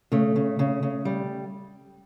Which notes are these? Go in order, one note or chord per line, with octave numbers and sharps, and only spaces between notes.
C#3 A3
C#3
C#3
C#3
G3